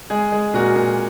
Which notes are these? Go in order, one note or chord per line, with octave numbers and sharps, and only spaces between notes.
G#3 G#4
G#3
A#2 F#4 A#4
A#2